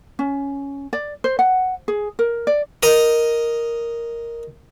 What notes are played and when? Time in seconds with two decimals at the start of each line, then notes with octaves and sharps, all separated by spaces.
0.19 C#4
0.93 D5
1.24 C5
1.39 F#5
1.88 G#4
2.19 A#4
2.47 D5
2.83 A#4 D#5 A#5